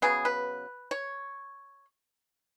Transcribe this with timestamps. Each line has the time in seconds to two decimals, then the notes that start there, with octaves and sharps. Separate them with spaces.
0.02 C#3 F#3 B3 G#4
0.25 B4
0.91 C#5